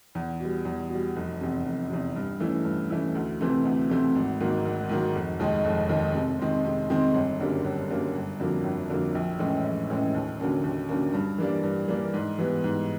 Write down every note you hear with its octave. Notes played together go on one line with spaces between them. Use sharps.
E2
B2 G3
E2
B2 G3
F1
E2 C3
F1
E2 C3
G2
E3 A3 C#4 E4
G2
E3 A3 C#4 E4
D2
C3 E3 A3 C4
D2
C3 E3 A3 C4
G#1
G#2 D#3 F#3 A#3
G#1
G#2 D#3 F#3 A#3
F1
D#2 D#3 G#3
F1
D#2 D#3 G#3
C3
D#3 G#3 C4
C3
D#3 G#3 C4
G1
F#2 D3 G3 A#3
G1
F#2 D3 G3 A#3
G1
F2 D3 F#3 A#3
G1
F2 D3 F#3 A#3
A#1
A2 E3 G#3 C#4
A#1
A2 E3 G#3 C#4
D#2
D3 F#3 A#3 C#4
D#2
D3 F#3 A#3 C#4
G2
E3 G3 A#3 D4
G2
E3 G3 A#3 D4
G#2
E3 G3 B3
G#2